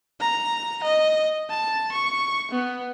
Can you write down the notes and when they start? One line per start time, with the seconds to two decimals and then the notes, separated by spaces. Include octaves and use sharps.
0.20 A#5
0.83 D#5
1.50 A5
1.92 C#6
2.51 B3